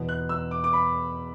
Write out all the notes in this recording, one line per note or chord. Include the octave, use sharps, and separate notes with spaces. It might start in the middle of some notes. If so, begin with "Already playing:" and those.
Already playing: E2 B2 B3
F#6
E6
D6
D6
B5